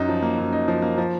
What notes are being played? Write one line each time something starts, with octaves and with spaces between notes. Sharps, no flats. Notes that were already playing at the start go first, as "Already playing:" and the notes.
Already playing: F#2 D#4
F3
A#3
F#2
D#4
F3
A#3
F3